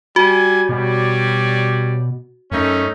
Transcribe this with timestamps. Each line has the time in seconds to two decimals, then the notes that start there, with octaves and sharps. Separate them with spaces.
0.16 G3 F#4 G#5
0.69 B2 G3 C#5 D5
2.52 F#2 A3 C#4 D#4